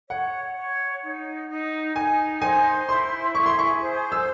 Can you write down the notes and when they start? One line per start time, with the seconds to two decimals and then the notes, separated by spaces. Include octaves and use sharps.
0.09 C#5 F#5
0.56 C#5
1.02 D#4
1.49 D#4
1.96 D#4 G#5
2.42 C5 G#5
2.88 E4 C6
3.34 G#4 C#6
3.46 C6
3.59 C#6
3.81 C5
4.12 E6